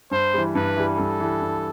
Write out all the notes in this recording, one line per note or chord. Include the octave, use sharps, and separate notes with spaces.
G2 C5
E3 G3
G2 B4
E3 G3
G2 A4
E3 G3
G2